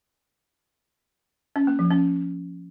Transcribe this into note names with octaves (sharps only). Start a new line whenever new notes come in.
C#4
A#3
F3
C#4